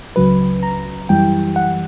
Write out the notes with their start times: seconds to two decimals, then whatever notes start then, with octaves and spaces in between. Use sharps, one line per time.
0.16 C#2 C#3 F#3 B4
0.63 A#5
1.09 F#2 E3 G3 G5
1.56 F#5